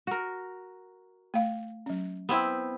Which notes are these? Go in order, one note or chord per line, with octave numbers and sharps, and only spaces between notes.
F#4 A#4
A3 F5
F#3 C#4
B3 C4 E4